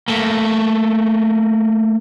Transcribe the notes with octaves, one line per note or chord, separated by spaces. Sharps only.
A3 A#3